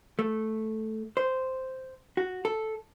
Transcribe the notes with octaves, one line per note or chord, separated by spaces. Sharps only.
A3
C5
F#4
A4